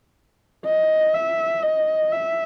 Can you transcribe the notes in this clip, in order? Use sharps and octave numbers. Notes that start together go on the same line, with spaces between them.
D#5
E5
D#5
E5